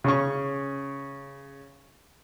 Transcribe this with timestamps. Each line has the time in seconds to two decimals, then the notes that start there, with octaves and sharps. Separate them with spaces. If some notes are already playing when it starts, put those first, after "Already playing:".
0.04 C#3 C#4 C#6